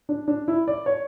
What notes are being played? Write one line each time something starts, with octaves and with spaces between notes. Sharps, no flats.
D4
D4
E4
D5
C#5